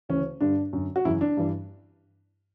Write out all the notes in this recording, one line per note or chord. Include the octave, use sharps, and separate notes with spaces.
D2 C#3 E3 C#4
G2 D3 D4
F#2 D3
F#4
F#2 C#3 E3 E4
D4
G2 E3